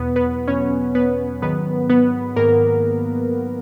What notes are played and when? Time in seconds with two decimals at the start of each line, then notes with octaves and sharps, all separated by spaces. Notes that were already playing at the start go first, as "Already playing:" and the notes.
Already playing: E2 B2 F#3 B3 B4
0.16 B3 B4
0.47 E2 B2 F#3 C#4 C#5
0.95 B3 B4
1.42 G#2 D#3 F#3 B3 B4
1.90 B3 B4
2.36 G#2 D#3 F#3 A#3 A#4